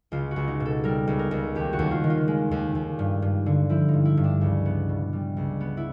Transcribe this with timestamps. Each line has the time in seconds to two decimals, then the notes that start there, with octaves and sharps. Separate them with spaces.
0.12 C#2 F4
0.31 F#4
0.36 C#2
0.48 D#4
0.60 B2
0.66 A4
0.84 G3 A#4
1.07 C#2
1.19 A#4
1.31 C#2
1.55 D#2 G4
1.73 F#4
1.79 D#2
1.91 F4
2.04 D#3
2.10 F4
2.28 G#3
2.51 D#2
2.75 D#2
2.99 G2
3.22 G2
3.46 D3
3.69 F3 E4
3.88 D#4
3.93 G2
4.05 E4
4.17 G2
4.24 D4
4.41 C#2
4.66 B3
4.89 B2
5.13 G3
5.37 C#2
5.60 B3
5.77 E4